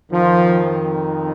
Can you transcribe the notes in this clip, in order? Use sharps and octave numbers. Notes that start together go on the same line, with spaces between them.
F2 D#3 F3